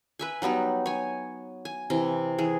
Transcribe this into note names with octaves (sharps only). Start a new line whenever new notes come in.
B4 E5 G#5
F#3 G3 B3 D#4
C#5 G#5
G#5
C3 E3 D#5
E3 G#4